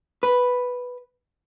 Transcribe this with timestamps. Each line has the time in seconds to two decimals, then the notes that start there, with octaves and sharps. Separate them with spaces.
0.23 B4